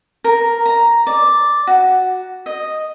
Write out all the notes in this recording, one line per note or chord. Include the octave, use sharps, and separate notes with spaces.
A#4
A#5
D5
F#4
D#5